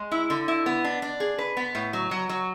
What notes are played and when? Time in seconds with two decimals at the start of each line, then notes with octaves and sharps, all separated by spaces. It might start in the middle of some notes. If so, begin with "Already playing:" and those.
Already playing: G#3
0.11 E4
0.30 D3
0.48 E4
0.66 B3
0.84 D4
1.02 D4
1.20 G#4
1.38 B4
1.57 B3
1.75 A2
1.93 F#3
2.11 F#3
2.29 F#3